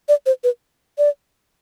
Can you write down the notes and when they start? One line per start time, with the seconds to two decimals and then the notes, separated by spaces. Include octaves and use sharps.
0.09 D5
0.26 C5
0.44 B4
0.98 D5